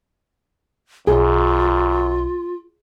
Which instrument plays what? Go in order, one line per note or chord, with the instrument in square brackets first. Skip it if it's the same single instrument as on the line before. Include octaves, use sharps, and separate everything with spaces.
[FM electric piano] B1 [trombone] F#2 [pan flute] F4 [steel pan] G#4